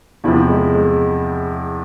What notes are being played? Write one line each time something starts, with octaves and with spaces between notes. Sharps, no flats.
E2 C3 F3 E4
G#3
G#3